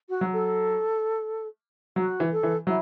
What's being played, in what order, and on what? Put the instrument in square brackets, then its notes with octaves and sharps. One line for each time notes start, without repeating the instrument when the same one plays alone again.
[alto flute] F#4
[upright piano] F#3
[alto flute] A4
[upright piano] F#3 [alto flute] F#4
[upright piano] E3
[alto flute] A4
[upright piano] E3
[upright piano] F#3 [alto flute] E4